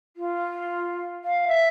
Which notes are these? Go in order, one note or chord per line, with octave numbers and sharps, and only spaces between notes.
F4
F5
E5